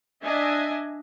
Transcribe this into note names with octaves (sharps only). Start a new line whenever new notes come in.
D4 D#5 E5 G#5